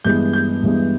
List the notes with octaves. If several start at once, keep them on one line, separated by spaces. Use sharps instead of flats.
G2 E3 G#3 B3 G6
G6
G2 E3 G#3 B3